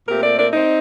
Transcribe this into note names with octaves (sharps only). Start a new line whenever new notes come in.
A#2 A3 C4 G4 A#4
A#4 D5
A#4 D5
C4 D#4